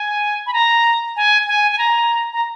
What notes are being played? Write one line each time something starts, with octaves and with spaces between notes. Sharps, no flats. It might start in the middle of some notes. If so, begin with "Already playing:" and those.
Already playing: G#5
B5
A#5
G#5
G#5
G#5
A#5
A#5